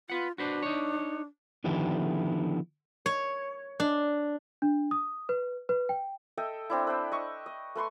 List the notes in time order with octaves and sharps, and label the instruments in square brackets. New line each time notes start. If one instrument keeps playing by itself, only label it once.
[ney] F4 [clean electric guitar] B4 F#5
[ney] D4 [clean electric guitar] F#4 B4 C5
[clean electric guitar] D#4 C#5
D3 D#3 F3 B3 E4 G4
[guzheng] C#5
D4
[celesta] D4
D#6
B4
B4
G5
[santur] A4 D#5 E5 G5
C4 D4 E4
B4 C5 G5
D#5 E5 C#6
D#5
A3 B4 C6 C#6